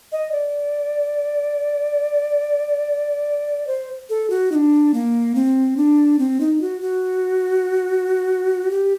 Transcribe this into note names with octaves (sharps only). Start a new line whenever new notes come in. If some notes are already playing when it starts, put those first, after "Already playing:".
D#5
D5
C5
A4
F#4
D#4
D4
A#3
C4
D4
C4
D#4
F#4
F#4
G4